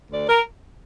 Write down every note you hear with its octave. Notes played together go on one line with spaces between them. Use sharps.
D2 D5
A#4